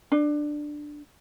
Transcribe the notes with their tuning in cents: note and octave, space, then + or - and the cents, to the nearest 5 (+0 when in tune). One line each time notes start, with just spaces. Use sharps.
D4 +10